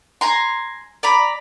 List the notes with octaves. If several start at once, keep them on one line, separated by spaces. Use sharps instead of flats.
G#5 A#5 C6
D5 A#5 B5